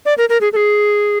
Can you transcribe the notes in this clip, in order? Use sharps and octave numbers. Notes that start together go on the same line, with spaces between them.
D5
A#4
A#4
G#4
A4
G#4